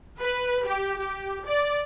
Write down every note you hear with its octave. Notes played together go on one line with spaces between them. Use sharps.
B4
G4
G4
D5